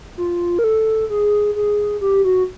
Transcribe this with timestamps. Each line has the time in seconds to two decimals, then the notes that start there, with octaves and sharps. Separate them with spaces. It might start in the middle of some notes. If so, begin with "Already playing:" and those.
0.17 F4
0.59 A#4
0.64 A4
1.10 G#4
1.56 G#4
2.01 G4
2.25 F#4